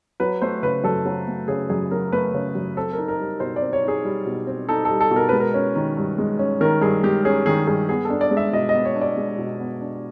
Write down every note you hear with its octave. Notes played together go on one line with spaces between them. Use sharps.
F#3 B4
A3 C5
C#3 B4
F#2 A4
F#3
A3
C#3 G#4
F#2 G#4
F#3 A#4
A3 B4
C#3
F#2
C4 A4
A#4
D#4
A#4
G3
B2 C5
D5
C4
C#5
D#4 G#4
G3
B2
C4
D#4 A4
A4
G3
A4
B2
A#4
G#3 B4
A#4
C#4
D#3
G2
G#3
C#4
D#3 A#4
G2 G#4
G#3 G4
C#4 G#4
D#3 G#4
G2 G#4
B3 G#4
A4
D4
D5
G#3
E5
B2 D#5
D#5
B3
C#5
D4
D5
G#3
B2
B3
D4